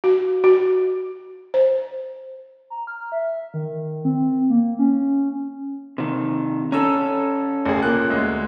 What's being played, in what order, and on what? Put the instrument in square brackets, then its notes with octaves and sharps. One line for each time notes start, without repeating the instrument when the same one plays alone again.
[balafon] F#4
F#4
C5
[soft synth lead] A#5
F6
E5
D#3
C4
A#3
C#4
[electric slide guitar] C3 D#3
[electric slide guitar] C#4 A4 [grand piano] A#5 E6
[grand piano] F#1 D2 G#4
A#2 A#3 F#6
D2 G#3